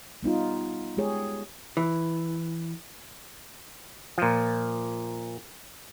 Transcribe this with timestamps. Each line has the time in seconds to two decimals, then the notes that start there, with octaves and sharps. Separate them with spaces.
0.23 G3 B3 D#4 F4
0.97 G#3 G4 G#4 C#5
1.77 E3
4.18 A#2 F3